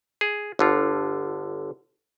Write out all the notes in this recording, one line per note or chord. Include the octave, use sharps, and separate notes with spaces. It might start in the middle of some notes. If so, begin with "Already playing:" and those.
G#4
G1 D3 F4